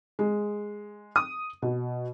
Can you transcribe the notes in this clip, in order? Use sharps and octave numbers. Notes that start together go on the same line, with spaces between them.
G#3
D#6
B2